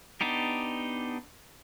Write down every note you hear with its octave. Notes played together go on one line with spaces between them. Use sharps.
B3 D4 D#4 G4